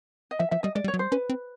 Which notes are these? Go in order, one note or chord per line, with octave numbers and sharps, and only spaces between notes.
D#5
F3 E5
F3 E5
G3 D#5
G#3 D5
G3
C#5
F#3
G3 C5
C#4 B4
C4